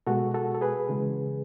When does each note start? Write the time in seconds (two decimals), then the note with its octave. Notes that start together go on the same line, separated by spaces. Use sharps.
0.07 B2 G#3 F#4 A4
0.34 F#4 A4
0.54 A4
0.61 G#4 B4
0.89 C#3 E3 G#3